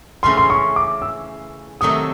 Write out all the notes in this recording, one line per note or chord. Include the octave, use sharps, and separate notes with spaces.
C#3 E3 A3 C#4 F4 C6
C6
C#6
D6
E6
C3 D#3 F#3 A3 D#6